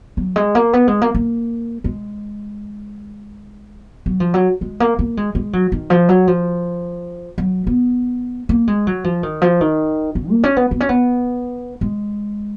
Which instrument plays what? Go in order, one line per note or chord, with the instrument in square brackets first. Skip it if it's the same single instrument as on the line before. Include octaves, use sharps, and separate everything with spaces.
[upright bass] F#3
G#3
A#3
B3
G#3
A#3
A#3
G#3
F#3
F3
F#3
G#3
A#3
A#3
G#3
G#3
F#3
D#3
F3
F#3
F3
F#3
B3
A#3
G#3
F#3
F3
D#3
F3
D#3
C#3
A#3
C#4
B3
B3
C#4
B3
G#3